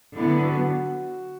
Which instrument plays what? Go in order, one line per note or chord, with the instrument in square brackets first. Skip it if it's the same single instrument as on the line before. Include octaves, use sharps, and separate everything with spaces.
[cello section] D3 F#3 B3 [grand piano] E4
[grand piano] F#4